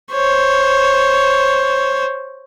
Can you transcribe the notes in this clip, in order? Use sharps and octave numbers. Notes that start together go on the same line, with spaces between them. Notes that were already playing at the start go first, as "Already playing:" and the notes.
C5 C#5